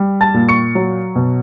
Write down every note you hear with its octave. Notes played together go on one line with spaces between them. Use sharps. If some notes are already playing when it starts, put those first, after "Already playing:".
Already playing: G3
A5 A6
A#2
C#6 C#7
F#3
B2